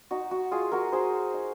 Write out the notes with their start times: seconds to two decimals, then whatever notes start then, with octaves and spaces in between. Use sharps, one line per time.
0.11 D#4 F#4
0.31 F#4
0.51 G#3 F4 G#4
0.72 F#4 A#4
0.92 D#4 G#4 C5
1.34 D#4